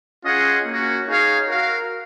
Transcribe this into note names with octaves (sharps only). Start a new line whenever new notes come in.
C#4 F4 G#4 D#5 F#5
A#3 C#4 F#4
D#4 G#4 C#5 F5
F#4 A#4 F5